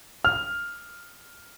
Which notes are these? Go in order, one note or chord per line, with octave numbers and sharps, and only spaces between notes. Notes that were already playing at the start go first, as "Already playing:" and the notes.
F6